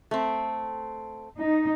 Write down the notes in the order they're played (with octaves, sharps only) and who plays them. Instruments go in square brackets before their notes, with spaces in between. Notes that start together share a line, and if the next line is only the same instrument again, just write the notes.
[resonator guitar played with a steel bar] A3 C4
[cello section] D#4